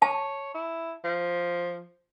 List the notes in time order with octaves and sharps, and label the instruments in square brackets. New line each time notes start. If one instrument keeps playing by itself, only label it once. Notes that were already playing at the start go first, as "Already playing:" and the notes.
[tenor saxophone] C#5 [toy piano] A5
[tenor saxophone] E4
F3